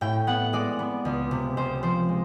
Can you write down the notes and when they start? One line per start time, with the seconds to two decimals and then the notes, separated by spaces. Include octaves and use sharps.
0.01 A2 G5
0.27 B3 F#5
0.53 G#3 D5
0.79 B3
1.05 C#2
1.31 C3
1.57 C#2 C5
1.83 F3 C5
2.09 G#3